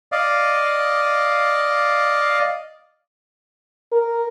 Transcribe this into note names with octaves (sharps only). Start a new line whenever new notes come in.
D5 D#5 F5
A#4